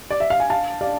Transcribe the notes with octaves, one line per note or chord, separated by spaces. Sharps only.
D5
E5
F5
G#5
F5 A5
D5 F5